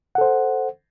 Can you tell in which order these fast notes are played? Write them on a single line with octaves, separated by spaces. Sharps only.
F#5 A4 C5